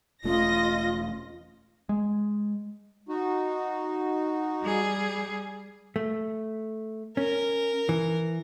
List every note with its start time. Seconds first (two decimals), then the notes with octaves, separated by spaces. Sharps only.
0.24 E1 A3 C#4 F4 D#5 A#6
1.89 G#3
3.09 D#4 F#4
4.63 G3 G#4
5.96 A3
7.17 C#4 A#4
7.89 E3